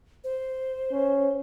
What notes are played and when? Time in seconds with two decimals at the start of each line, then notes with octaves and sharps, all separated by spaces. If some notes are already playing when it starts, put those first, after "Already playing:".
0.24 C5
0.92 C#4